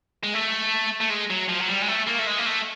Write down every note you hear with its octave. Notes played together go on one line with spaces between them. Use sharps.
G#3
A3
A3
G#3
F#3
F3
F#3
G3
G#3
A3
A#3
A3
G#3
A#3
A3